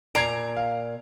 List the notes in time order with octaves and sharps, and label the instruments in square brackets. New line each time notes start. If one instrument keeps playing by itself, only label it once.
[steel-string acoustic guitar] A#2 A#5 [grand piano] G#6 C7 D7
[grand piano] F5